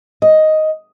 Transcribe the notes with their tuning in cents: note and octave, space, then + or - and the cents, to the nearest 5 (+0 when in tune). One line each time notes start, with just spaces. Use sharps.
D#5 +5